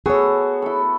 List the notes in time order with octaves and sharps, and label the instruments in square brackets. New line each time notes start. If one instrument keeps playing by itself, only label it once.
[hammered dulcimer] B3 F#4 A4 [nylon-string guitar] G#4 C#5
[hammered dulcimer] E4 A4